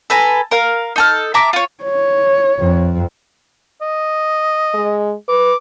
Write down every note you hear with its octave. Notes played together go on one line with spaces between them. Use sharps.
A4 B4 G#5 A#5
A#4 F5
D#4 A4 F6
E5 A5 A#5 D6
F4 C#5
C#5
F2
D#5
G#3
B4 D6